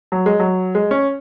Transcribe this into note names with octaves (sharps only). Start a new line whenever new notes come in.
F#3
G#3
F#3
G#3
C#4